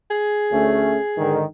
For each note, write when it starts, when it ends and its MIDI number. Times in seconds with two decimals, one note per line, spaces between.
0.11 1.43 68
0.52 0.99 38
0.52 0.99 57
0.52 0.99 61
1.18 1.44 44
1.18 1.44 50
1.18 1.44 51